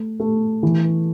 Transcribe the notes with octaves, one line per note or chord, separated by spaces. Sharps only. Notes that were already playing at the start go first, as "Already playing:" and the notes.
Already playing: A3
A3
E3